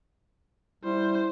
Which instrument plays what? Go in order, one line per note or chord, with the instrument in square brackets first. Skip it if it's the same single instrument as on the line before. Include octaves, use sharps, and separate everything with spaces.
[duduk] G3 [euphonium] E4 [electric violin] C5